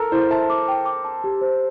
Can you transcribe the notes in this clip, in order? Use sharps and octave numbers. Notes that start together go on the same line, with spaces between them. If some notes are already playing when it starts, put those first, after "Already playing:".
Already playing: A4 A#4
E4 C5
E5 A5
D6
G5
D6
A5
G4
C5